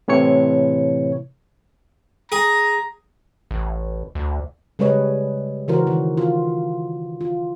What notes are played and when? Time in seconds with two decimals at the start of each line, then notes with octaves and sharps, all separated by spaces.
0.08 A2 C3 E3 C#5 C#7
2.32 G#4 A#5
3.51 A1
4.15 D2
4.79 C#3 G3 G#3 B4 C#5 D#5
5.68 C#3 E3 F#4 A#4 C5
5.87 D#3
6.17 F4
7.21 F4